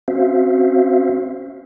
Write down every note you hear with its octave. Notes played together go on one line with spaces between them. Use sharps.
C4 C#4 F#4 C5 E5 F5